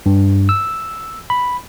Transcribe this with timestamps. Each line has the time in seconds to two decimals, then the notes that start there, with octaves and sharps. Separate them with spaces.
0.06 G2
0.49 E6
1.30 B5